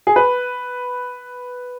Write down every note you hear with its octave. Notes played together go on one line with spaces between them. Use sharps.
G#4
B4